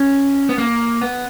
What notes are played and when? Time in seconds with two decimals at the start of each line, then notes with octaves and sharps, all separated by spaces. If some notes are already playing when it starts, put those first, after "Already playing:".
Already playing: C#4
0.49 B3
0.58 A#3
1.02 B3